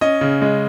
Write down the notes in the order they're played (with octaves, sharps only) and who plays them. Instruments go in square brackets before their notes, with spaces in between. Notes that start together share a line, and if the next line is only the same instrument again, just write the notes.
[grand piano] C#4 D#5
C#3
G#3